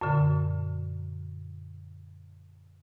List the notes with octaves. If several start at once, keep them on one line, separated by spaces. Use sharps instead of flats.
F#2 A#2 D3